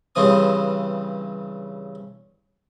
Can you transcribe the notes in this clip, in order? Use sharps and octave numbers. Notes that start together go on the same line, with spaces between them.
G2 C#3 E3 C4 D#6